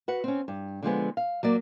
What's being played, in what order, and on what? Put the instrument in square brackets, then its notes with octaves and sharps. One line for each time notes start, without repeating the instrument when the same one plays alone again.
[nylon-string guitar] F#4 B4 F#5
C4 C#4
G2
D3 F3 G#3 B3
F5
F#3 A#3 D5